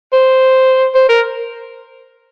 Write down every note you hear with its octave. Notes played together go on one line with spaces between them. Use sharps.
C5
C5
A#4